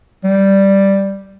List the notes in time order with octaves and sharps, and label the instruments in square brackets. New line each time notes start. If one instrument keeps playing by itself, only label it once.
[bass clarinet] G3